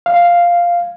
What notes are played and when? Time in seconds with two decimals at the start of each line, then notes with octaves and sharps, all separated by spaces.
0.06 F5